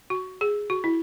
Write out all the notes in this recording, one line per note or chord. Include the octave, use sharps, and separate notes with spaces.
F#4
G#4
F#4
E4